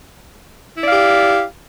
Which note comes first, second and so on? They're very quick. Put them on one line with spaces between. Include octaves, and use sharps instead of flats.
E4 D5 F5 G4